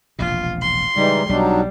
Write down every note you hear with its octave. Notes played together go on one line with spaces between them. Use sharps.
E1 A#1 C3 F4
C6
C#3 E3 G3 G#3 D#4
B1 F#3 G3 D4 D#4